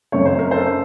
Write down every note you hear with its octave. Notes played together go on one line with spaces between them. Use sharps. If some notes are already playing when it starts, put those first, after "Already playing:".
F#2 C#3 A3 C4 C#5
C5
A#4
A4 C5